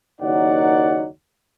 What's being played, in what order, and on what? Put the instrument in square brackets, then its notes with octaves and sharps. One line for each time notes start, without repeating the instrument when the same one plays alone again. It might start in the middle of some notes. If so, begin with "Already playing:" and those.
[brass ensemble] F#1 D#2 F#3 D#4 D5 F#5